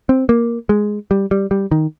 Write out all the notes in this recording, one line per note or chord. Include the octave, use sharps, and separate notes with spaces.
C4
A#3
G#3
G3
G3
G3
D#3